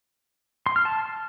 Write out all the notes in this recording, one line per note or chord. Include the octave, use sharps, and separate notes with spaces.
C6
F6
A5